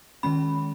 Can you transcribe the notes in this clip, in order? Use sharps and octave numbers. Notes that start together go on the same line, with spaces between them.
D#3 G#3 C#4 B5